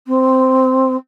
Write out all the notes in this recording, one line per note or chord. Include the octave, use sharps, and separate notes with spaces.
C4